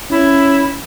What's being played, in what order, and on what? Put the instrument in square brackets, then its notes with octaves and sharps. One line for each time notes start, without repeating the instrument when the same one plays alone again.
[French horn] C#4 [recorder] E4